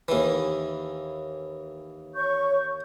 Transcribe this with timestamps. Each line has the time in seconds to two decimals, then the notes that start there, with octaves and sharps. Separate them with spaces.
0.08 D#2 E3
2.15 C#5 C#6 G6